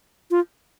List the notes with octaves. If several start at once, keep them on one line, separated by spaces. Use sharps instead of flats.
F4